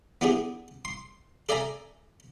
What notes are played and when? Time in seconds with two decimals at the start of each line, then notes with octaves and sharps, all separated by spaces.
0.21 B3 D4 E4 G4 G#4
0.85 C6
1.49 A4 D5 E5 G#5 A#5